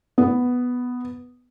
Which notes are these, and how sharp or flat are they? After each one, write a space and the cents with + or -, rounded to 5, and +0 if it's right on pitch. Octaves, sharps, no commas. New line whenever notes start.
B3 +0